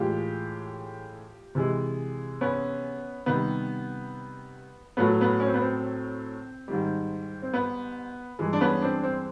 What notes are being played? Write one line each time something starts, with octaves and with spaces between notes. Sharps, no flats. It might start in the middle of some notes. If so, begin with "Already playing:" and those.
Already playing: A2 E3 G#3 F4 G4
C3 E3 G#3
B3 C#4
C3 D#3 G3 B3
A2 F#3 A3 B3
B3
C#4
C4
B3
C4
G#2 D#3 G3
C4
B3
G2 E3 G#3
D4
B3 C#4
C4 D4
C4